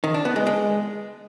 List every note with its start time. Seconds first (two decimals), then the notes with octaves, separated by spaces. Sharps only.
0.04 D#3
0.14 D4
0.25 B3
0.36 G#3
0.47 G#3